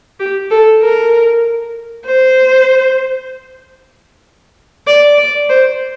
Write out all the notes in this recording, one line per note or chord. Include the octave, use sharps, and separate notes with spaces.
G4
A4
A#4
C5
D5
D5
C5